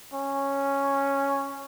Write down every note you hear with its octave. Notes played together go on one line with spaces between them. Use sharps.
C#4